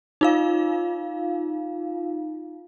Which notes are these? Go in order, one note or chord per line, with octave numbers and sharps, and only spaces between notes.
D#4 F4 F5